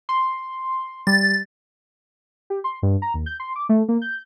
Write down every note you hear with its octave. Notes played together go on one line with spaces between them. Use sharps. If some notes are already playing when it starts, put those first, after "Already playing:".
C6
G3 A6
G4
C6
G2
A#5
D#2
G6
C6
D6
A3
A#3
G6